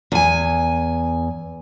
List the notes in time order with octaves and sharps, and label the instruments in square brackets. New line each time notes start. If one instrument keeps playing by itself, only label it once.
[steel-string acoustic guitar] E2 G#5